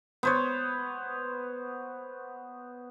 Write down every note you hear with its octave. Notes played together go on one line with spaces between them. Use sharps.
B3 C5 C#5